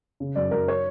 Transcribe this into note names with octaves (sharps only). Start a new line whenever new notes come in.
C#3
F#2 D5
F#2 A#4
C#5